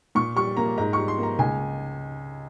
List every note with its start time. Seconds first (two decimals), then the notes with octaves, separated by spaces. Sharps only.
0.15 A#2 C#6
0.36 G3 C#6
0.57 A#3 A#5
0.77 G#2 A#5
0.93 G3 C#6
1.08 C6
1.18 A#3 A#5
1.38 C#2 G#5